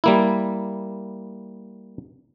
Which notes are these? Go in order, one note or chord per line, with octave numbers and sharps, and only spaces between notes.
G3 A#3 E4